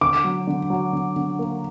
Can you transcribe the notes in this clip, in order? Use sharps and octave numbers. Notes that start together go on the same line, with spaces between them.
D3 D6
F#3
D3
F#3
D3
D3
A#3